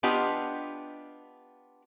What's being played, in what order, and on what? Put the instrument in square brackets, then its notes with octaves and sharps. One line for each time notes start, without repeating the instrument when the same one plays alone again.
[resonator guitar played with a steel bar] B3 D4 F4 G4 D#5